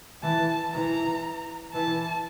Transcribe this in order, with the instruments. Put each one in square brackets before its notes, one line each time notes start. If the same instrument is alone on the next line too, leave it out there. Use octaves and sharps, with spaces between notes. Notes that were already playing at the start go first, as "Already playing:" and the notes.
[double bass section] E3 [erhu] A5
[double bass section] E3 [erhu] A#5
[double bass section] E3 [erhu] A5